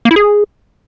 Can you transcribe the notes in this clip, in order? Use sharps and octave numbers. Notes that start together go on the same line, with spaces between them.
A#3
E4
G#4